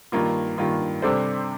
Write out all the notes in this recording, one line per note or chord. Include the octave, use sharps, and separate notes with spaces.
G2 D#3 A#3 F4
G2 D#3 A#3 F4
C3 G3 D4 A4 C5